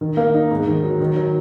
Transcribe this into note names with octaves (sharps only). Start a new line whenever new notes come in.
D#3
A#3
D#4
G#2
D#3
F#3
D#3
F#3